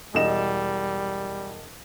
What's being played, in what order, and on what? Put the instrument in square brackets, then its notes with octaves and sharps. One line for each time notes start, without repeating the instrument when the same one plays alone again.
[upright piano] E1 D#5 E7 [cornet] G3